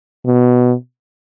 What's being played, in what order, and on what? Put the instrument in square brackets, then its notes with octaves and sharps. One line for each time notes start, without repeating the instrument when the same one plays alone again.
[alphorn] B2